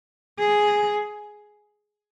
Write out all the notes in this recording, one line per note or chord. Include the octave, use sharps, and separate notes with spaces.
G#4